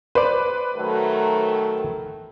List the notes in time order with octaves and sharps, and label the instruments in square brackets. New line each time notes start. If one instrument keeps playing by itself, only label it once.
[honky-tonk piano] B4 [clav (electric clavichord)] C5 D5
[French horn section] D#3 F#3 A3